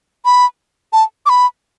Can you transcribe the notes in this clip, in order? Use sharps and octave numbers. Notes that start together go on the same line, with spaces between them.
B5
A5
D6
B5